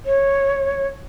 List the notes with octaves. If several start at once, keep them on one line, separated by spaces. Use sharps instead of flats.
C#5